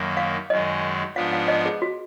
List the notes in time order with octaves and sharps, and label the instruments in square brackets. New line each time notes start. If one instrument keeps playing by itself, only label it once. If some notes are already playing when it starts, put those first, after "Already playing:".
Already playing: [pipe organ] F#2 D#3 A#3
[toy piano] F5
[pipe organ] F#2 D#3 G#3 [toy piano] D#5
[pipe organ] G#2 F3 B3 D4 [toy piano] F5
[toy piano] F5
D#5
G#4
F#4